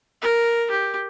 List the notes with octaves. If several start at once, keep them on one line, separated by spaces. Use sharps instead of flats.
A#4
G4